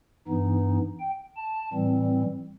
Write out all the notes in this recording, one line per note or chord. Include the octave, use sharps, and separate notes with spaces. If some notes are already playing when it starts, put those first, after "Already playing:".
G2 E3 B3 D#4
G5
A5
A2 E3 G3 C4